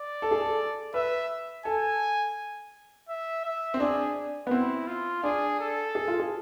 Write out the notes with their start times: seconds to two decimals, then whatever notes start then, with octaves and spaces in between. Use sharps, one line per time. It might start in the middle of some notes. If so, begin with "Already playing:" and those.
Already playing: D5
0.22 A4
0.31 G#4
0.40 A4
0.94 B4 E5
1.65 A4 G#5
3.09 E5
3.45 E5
3.74 C4
3.80 D4 G#4
4.47 B3
4.51 C4 E4
4.87 F4
5.23 D4 G#4
5.60 A4
5.95 G#4
6.08 F4
6.20 G#4